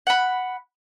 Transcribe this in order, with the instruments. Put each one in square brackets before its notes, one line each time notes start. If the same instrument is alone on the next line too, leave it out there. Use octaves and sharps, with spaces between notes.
[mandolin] F#5 B5